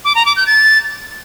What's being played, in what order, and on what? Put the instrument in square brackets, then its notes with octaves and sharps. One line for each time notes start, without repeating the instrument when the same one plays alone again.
[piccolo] D6
A#5
D6
G6
A6